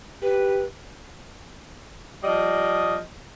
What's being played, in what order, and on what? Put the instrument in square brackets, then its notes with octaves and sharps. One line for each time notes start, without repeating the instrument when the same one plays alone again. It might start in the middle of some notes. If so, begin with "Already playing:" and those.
[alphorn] G4 [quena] B4
[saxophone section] F3 G3 D#5